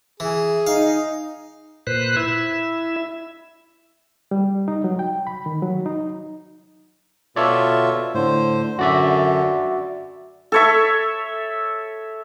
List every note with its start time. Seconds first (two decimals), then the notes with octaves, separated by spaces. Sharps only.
0.20 E3 G#4
0.67 D#4 F5
1.87 A#2 B4 C5 F#6
2.17 E4 E5
4.31 G3
4.68 D#4
4.84 F#3
4.99 G5
5.27 B5
5.46 D#3
5.62 F#3
5.86 D#4
7.36 B2 F4 A4 C#5 D5 E5
8.15 A2 D3 C5
8.79 F#2 D3 F#4 D5 E5
10.52 A4 C#5 E5